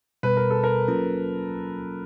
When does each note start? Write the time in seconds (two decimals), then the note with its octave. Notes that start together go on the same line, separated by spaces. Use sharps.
0.23 B2 G3 B3 B4
0.37 A#4
0.50 A4
0.64 A#4
0.88 F#3 A#3 C#4 F4